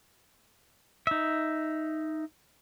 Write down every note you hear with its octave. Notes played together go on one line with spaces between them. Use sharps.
D#4 E5